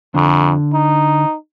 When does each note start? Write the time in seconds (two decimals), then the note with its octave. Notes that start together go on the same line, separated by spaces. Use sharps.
0.15 F2 D3
0.73 D#4